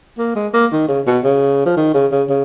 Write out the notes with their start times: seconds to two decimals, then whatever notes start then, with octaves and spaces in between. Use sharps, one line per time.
0.18 A#3
0.35 G#3
0.54 A#3
0.72 D#3
0.88 C#3
1.06 B2
1.24 C#3
1.65 F3
1.77 D#3
1.94 C#3
2.11 C#3
2.29 C#3